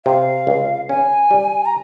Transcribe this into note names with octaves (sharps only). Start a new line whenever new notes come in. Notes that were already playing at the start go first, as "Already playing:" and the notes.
C3 F5
C#2
C#4 G#5
G3
A#5